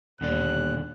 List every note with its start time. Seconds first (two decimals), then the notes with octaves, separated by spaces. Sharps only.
0.21 D#1 D#2 B2 D3 D5 F#6